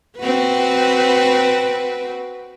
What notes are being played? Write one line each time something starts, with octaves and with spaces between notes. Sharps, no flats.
C4 F#4 B4